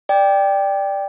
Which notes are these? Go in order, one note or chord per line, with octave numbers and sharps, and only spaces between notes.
D5 G5